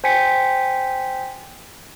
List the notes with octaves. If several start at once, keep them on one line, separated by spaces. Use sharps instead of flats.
C5 G5 G#5 B6 C#7